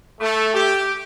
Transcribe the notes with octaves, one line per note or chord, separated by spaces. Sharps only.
A3
G4